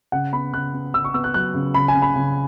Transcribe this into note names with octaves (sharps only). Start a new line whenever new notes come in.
C#3 F#5
B3 B5
C#3 F#6
B3
C#3 E6
C#6
B3 E6
F#6
F#3 F#6
C#3
C#3 B5
G#5
C#3
B5
C#3